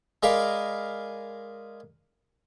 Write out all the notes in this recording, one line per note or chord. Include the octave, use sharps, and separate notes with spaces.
G#3 G#4 A#4 D5 F5 B5